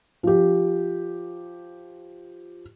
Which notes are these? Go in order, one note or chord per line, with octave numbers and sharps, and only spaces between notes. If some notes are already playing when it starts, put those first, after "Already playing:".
F3 G4